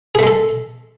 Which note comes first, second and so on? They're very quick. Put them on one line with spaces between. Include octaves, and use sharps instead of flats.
G#4 A3 G#3 A4